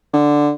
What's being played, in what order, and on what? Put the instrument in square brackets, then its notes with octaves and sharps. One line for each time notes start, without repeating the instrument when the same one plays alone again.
[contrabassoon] D3